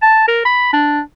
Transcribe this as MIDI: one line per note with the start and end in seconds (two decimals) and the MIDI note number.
0.02 0.26 81
0.28 0.44 70
0.45 0.71 83
0.73 1.00 62